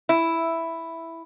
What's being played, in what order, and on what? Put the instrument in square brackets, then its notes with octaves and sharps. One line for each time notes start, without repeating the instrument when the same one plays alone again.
[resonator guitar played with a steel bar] E4